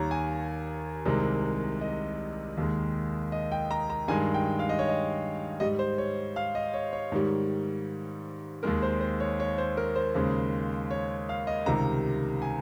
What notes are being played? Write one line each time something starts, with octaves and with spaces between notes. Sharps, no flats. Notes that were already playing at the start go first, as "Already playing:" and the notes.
Already playing: D#2 D#3 G3 C#5 A#5
G#5
C2 C3 D#3 G#3
D#5
D#2 D#3 G#3
D#5
G5
A#5
A#5
G2 D#3 G#3 G#5
G5
F5
D#5
C#5
D#5
G#2 G3 D#5
C5
C#5
F5
D#5
C#5
C#5
G#2 D#3 G3
D#2 D#3 G#3 A#4
C5
C5
C#5
C#5
C5
A#4
C5
D#2 C#3 G#3
C#5
F5
D#5
C#2 C3 D#3 G3 A#5
G#5